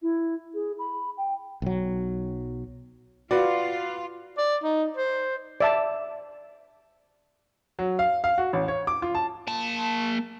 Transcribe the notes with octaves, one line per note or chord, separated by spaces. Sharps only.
E4
G#4
B5
G5
B1 F#3
F4 F#4 B4 D5
D5
D#4
C5
D5 E5 A5
F#3
F5
F5
F#4
A1
C#5
D6
F4
A5
A#3 A5